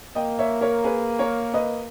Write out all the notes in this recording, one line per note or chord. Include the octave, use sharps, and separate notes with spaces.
A#3 D#5 G5
C#5 E5
A#4 C#5
G#4 B4
A#4 C#5
B4 D#5